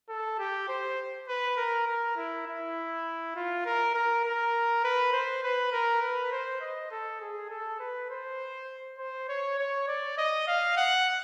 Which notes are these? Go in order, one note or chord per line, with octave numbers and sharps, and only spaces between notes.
A4
G4
C5
B4
A#4
A#4
E4
E4
F4
A#4
A#4
A#4
B4
C5
B4
A#4
B4
C5
D#5
A4
G#4
A4
B4
C5
C5
C#5
C#5
D5
D#5
F5
F#5